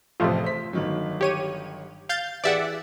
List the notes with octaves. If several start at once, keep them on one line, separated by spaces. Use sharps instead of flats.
A1 F2 C3 A3 F4
C5 B6
G1 D#3 F#3
G4 C#5 D#7
F5 G6 A6
E3 G4 G#4 D5 E5 F#5